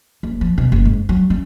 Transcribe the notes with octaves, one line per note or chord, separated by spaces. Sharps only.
F#1
F3
B2
F#1
G#2
F#3
C#4